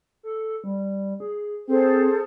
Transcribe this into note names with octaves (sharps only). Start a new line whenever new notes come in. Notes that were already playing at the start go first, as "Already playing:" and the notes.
A4
G3
G#4
C4 G#4 A4 C5